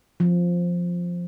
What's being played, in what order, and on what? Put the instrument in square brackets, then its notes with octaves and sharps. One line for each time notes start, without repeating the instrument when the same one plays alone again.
[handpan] F3